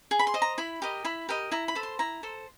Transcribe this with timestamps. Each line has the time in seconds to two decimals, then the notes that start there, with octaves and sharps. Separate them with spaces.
0.11 G#4
0.19 B5
0.27 C6
0.34 C5 D#5
0.42 A#5
0.58 E4 B5
0.82 G4 A#4 D#5
1.05 E4 B5
1.29 G4 A#4 D#5
1.52 E4 A#5
1.68 B5
1.75 A4 C5
1.83 C6
1.99 E4 A#5
2.23 A4 C5